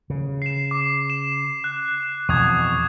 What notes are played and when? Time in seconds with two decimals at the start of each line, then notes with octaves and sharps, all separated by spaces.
0.10 C#3
0.42 C7 E7
0.71 D6
1.10 E7
1.64 F#6
2.29 F2 B2 E3 C#6 D#6 G#6